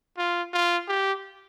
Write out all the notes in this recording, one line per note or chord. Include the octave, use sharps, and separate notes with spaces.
F4
F4
G4